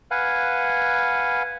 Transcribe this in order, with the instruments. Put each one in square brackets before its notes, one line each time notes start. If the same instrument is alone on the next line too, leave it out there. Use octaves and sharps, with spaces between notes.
[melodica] B4 F5 F#5 G#5